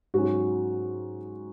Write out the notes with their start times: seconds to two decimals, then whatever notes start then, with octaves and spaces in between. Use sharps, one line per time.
0.14 G#2 F#3 C#4 F#4